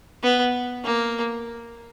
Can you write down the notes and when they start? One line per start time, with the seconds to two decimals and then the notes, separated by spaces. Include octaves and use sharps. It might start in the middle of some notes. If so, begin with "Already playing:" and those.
0.23 B3
0.85 A#3